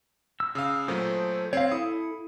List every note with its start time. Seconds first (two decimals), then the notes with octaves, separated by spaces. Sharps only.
0.40 E6
0.55 C#3 F5 D#6 E6
0.88 A#2 F#3 A3 A4 C5 D#6
1.53 C4 C#5 F5 C7
1.72 E4 A4 D#6